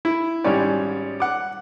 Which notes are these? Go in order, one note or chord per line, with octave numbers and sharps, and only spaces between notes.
E4
G#1 G#2 G3 C#4 C#5 D5
F#5 D6